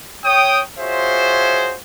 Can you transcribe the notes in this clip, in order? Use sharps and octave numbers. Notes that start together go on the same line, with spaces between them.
C#5 G5 D#6
F4 F#4 G#4 C5 C#5 E5